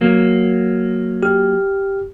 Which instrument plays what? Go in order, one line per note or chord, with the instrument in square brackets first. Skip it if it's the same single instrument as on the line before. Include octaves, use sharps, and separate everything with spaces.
[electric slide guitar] F#3 A#3
[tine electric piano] G4 F6